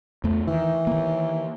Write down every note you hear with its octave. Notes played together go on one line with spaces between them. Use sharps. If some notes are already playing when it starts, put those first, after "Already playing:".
E2 A3
D#3 E3
D#3 A#3